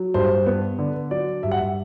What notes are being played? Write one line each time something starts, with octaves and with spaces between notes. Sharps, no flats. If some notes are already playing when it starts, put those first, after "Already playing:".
Already playing: F#3
G2 C5
B3
D3
F#3 D5
G2 E5
F#5
E5